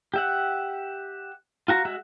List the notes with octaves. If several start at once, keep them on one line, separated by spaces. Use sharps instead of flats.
G4 E5 F#5
F4 F#4 A#5
G#3 F#4 E5